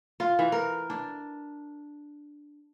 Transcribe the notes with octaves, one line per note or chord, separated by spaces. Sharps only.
F4
E3
A#4
D4